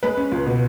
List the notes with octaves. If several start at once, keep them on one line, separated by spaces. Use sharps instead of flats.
G#3 B4 B5
C#4
C#2
B2